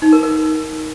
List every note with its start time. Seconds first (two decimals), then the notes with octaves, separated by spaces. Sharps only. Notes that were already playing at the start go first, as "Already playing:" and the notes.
0.02 D#4
0.12 A#4
0.23 A#4